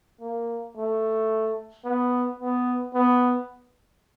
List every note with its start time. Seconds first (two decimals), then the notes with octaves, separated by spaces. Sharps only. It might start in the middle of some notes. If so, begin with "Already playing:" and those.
0.21 A#3
0.77 A3
1.85 B3
2.40 B3
2.94 B3